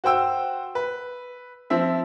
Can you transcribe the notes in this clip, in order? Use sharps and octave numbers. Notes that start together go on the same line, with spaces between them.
F#4 C5 G5 E6
B4
F3 C4 E5